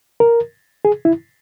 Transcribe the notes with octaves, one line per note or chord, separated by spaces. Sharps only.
A#4
G#4
E4